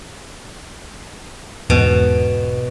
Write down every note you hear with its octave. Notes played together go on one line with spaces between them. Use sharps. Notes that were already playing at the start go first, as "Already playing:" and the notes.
E1 E2 G#2 B2